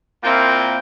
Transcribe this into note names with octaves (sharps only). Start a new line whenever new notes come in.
A#2 A#3 C4 E4 F4 G5